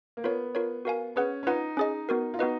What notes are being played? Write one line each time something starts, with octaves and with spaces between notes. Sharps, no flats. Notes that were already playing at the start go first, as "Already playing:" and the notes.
A#3
B3 F4 A#4 C#5
F4 A#4 C#5
F#4 A#4 F5 G#5
C#4 G#4 B4 F#5
C#4
D#4 F4 B4 F#5
C#4 G#4 D#5
B3 F#4 A#4
F4
B3 D#4 F#4 B4 D#5